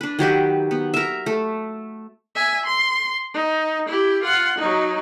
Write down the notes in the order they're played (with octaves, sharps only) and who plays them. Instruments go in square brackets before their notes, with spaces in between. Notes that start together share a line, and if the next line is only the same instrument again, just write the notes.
[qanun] D4 B4
D#3 F#3 G4 B4
B3
A#4 E5
A3
[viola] E5 G#5
C6
D#4
E4 G4
F4 F#5
F#3 D#4